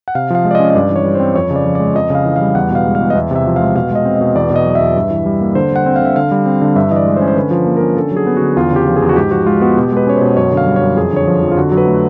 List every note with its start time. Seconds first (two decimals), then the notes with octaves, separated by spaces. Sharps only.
0.08 F#5
0.15 C3 F5
0.30 F3 F5
0.45 G#3
0.51 D5
0.55 C#4 D#5
0.70 D#5
0.75 G2 D5
0.90 E3
0.96 C#5
1.05 G3
1.15 C4 C5
1.36 F2 C#5
1.51 C#3
1.56 D5
1.66 F3
1.75 G#3 D5
1.95 F2 D#5
2.10 C#3 F5
2.25 E3
2.36 G3 F5
2.55 E2 F#5
2.71 B2 F5
2.85 G#3
2.95 F5
3.01 E2
3.10 D#5
3.15 E2 E5
3.31 C3 E5
3.46 F3
3.56 G#3 F5
3.76 B2 F5
3.91 G#3 D#5
4.05 C4
4.16 B2 D#5
4.35 E2 D5
4.50 B2
4.56 D#5
4.66 F#3
4.75 E5
4.81 E2
4.96 G2
5.10 E3
5.26 G3
5.41 A#3
5.55 D3 C5
5.71 G3 F#5
5.86 C4
5.96 F5
6.01 D3 E5
6.16 D3 F5
6.31 G3
6.46 C4
6.62 D3 F5
6.76 G2 E5
6.91 E3 D#5
6.96 D5
7.06 G#3
7.16 C5
7.21 C#4
7.28 C5
7.36 D3 B4
7.51 F3
7.66 A#3
7.77 C#4 A#4
7.97 D3 A4
8.11 F#3
8.17 G#4
8.27 B3
8.37 D3 F#4
8.56 E2 F4
8.71 C#3 G4
8.87 F3
8.96 G#4
9.02 E2
9.09 F#4
9.16 G#2 G4
9.31 F3 F#4
9.47 G#3 F4
9.61 B3 F#4
9.77 B2 G4
9.92 G#3 B4
10.07 C#4 C#5
10.16 B2 C5
10.37 F#2 C#5
10.52 D3
10.57 F5
10.67 G3
10.76 C#5
10.82 F#2
10.96 F2 G#4
11.12 D3 C#5
11.27 F3
11.42 F2
11.52 F4
11.57 D3 F#4
11.72 F#3
11.77 B4
11.87 A3